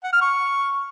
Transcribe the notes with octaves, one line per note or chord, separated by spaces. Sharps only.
F#5
F6
C#6